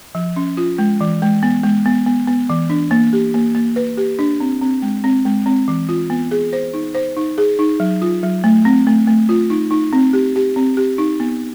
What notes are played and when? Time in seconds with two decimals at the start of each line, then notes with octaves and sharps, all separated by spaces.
0.15 F3
0.36 C#4
0.57 F4
0.78 G#3
1.01 E3
1.22 G#3
1.43 B3
1.63 G#3
1.86 B3
2.06 B3
2.27 B3
2.50 E3
2.70 D4
2.91 A#3
3.13 G4
3.34 A#3
3.55 A#3
3.76 B4
3.97 G4
4.19 D4
4.40 C4
4.62 C4
4.82 G#3
5.04 C4
5.25 G#3
5.46 C4
5.68 E3
5.89 F4
6.10 B3
6.31 G#4
6.53 C5
6.74 D#4
6.95 C5
7.17 D#4
7.38 G#4
7.59 D#4
7.80 F#3
8.02 F4
8.23 F#3
8.44 A3
8.65 C4
8.87 A3
9.07 A3
9.29 F4
9.50 D#4
9.71 D#4
9.93 C4
10.13 G4
10.36 G4
10.56 C4
10.77 G4
10.98 D#4
11.20 B3